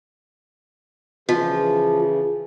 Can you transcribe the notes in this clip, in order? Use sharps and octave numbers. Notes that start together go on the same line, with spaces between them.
C#3 E3 F3